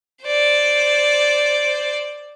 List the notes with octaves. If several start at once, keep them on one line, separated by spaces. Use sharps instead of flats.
C5 D5